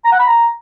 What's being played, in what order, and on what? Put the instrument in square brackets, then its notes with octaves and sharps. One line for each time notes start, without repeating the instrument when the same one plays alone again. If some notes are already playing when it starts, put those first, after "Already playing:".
[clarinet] A#5
F#5
B5
A#5